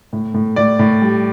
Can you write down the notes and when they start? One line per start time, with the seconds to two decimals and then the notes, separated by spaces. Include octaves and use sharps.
0.13 A2
0.34 A2
0.56 A2 D5
0.79 A2
1.02 G3